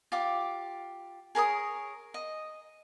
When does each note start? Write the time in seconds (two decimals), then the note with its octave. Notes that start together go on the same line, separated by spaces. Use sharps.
0.12 F4 G4 D6
1.35 G#4 A#4 C#5 D#6
2.14 D#5